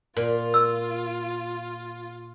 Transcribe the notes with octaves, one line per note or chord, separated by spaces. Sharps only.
A#2 F4
E6